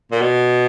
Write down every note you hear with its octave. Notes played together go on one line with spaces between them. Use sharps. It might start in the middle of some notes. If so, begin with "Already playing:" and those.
A#2
B2